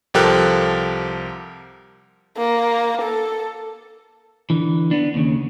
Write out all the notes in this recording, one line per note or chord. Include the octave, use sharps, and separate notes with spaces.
C2 F3 G4 A4 A#4 F#6
A#3
A4
D3 E3
B3 D4
D#2 C#3